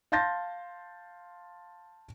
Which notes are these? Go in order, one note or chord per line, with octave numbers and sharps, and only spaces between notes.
F5 A5 C6 G6 A6 A#6